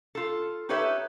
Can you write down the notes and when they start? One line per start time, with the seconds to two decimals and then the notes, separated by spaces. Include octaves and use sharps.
0.15 F4 A4
0.69 D#4 G4 A4 B4 C#5 E5